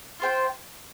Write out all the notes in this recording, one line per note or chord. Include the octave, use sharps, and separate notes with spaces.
F4 C5 G5